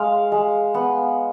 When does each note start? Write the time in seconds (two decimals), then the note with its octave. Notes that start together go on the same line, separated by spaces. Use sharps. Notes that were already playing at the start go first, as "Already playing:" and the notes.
Already playing: G#3 F5
0.32 G#3
0.74 B3